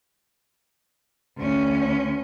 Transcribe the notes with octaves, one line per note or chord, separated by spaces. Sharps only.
D2 C#4